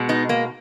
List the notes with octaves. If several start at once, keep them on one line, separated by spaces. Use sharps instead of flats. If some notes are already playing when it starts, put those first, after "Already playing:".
Already playing: B2 G#3
B3 D#4
A#3